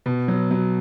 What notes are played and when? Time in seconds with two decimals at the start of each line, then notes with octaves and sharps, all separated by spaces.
0.06 B2
0.28 F#3
0.51 F#3